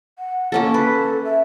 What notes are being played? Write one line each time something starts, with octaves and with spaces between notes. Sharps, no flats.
F#5
A#3 C#4 A4
A4 B4
E5